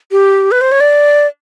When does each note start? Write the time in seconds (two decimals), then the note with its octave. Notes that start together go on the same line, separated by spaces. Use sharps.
0.12 G4
0.51 B4
0.61 C5
0.72 C#5
0.80 D5